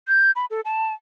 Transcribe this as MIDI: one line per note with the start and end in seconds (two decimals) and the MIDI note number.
0.08 0.31 91
0.36 0.46 83
0.50 0.61 69
0.65 0.93 81